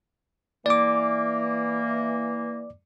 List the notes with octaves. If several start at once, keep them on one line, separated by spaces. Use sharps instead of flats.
E3 A#3 D5 D6